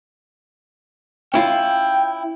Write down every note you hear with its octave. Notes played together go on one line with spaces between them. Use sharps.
C#4 E4 F4 G5